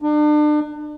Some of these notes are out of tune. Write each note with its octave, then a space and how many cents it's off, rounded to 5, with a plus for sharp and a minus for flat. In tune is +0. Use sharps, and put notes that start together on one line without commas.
D4 +35